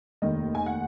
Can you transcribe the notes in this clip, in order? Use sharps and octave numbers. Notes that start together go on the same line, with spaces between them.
F1 D#2 D#3 D#5
G#5
F#5